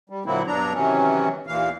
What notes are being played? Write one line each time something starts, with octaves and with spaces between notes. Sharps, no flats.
G3
A#2 D3 F#3 A#3 C4 E4
G2 B2 F#3 D4 A#5
C3 D#3 E3 F#3 C#4
D#2 A#2 E3 F5